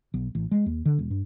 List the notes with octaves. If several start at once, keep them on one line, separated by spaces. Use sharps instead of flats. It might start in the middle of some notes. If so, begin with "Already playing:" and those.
B1
A1
G#3
D#2
D3
E1
G2